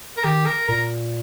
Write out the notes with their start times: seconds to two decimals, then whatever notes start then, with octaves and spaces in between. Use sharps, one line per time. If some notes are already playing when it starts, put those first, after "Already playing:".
0.17 A#4
0.24 D#3 G4
0.46 A#4
0.68 A#2 A#4